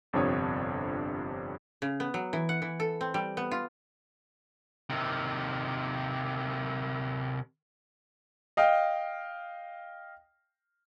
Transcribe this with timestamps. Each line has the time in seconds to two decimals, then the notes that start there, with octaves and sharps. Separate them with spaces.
0.13 G1 F2 C3 D4 C#5 D#6
1.82 C#3
2.00 B3
2.14 F#3
2.33 E3
2.49 F#5
2.62 E3
2.80 A4
3.01 C4
3.14 G3
3.37 B3
3.51 F4
4.90 C3 D#3
8.57 D#5 F5 G5